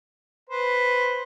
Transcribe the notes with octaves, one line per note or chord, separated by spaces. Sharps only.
B4 C5